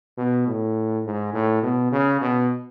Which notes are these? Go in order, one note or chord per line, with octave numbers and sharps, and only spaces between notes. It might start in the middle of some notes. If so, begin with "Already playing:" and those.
B2
A2
G#2
A2
B2
C#3
B2